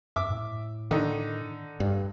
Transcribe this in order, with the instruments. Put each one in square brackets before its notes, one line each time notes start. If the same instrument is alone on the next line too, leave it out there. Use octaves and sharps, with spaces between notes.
[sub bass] F#2 [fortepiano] E5 D6
[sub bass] A2
[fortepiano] D3 D#4 [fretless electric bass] D#3
[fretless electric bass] G2